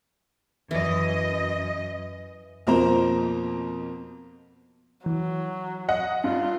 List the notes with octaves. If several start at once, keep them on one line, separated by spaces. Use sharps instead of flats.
F#2 E3 D#5
F2 B2 F3 A#3 C5 A#5
E3 F#3
D#5 F#5
G2 F4